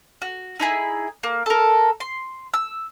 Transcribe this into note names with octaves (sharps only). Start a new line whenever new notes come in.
F#4
D#4 E4 G#4
A#3
A4 A#4
C6
E6